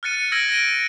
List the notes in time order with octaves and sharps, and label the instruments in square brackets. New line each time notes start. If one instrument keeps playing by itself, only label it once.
[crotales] F6 F#6 A6 C#7 D#7
C#7
E6 F6 G#6 A#6 D7 F#7
A#6 D7 D#7 G7